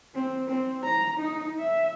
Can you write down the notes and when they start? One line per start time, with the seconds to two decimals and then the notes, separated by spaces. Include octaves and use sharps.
0.14 C4
0.48 C4
0.84 A#5
1.17 D#4
1.59 E5